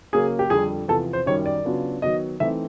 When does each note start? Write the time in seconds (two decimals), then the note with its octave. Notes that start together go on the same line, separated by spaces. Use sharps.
0.12 C#3 F#3 A#3 C#4 G#4
0.39 G4
0.50 F2 D3 G3 G#4
0.88 E2 C3 F3 A4
1.13 C5
1.26 F#2 D#3 G3 C#5
1.46 D5
1.65 C#3 F#3 B3 D4 F4
2.02 D#3 F#3 B3 D#5
2.40 E3 A3 C4 D#4 E5